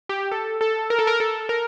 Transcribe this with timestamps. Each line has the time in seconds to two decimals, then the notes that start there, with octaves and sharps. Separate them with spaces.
0.09 G4
0.32 A4
0.61 A4
0.90 A#4
0.99 A4
1.07 A#4
1.20 A4
1.49 A#4